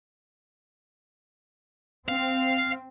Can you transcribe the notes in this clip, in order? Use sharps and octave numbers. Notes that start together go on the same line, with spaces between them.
C4 F5